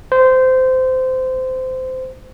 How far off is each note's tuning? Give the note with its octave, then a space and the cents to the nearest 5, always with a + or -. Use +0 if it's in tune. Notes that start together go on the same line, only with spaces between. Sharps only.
C5 -20